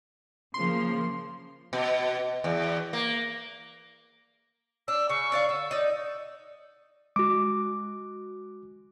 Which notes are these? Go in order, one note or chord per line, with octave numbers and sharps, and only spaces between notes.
C#3 F3 A#3 C6
B2
E2
A#3
D4 E6
C#3 C#6
D4 D5 F5
D3 E6
D#4 D5
G#3 F#4 D6